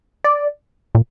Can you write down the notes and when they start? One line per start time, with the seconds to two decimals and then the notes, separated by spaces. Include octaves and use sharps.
0.24 D5
0.95 A#2